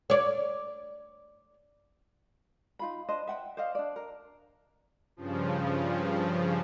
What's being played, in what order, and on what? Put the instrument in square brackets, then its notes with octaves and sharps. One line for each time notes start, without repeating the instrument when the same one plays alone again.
[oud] C#5 D5
[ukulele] D#4 F4 B5
D4 C5 D#5
E5 F#5 G5
C5 D5 D#5 F5
D4 D5
A#4
[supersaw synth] G2 C#3 F3